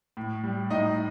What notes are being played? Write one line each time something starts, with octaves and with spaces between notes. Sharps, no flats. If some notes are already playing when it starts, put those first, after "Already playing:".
A2
G3
A2 D#4 D#5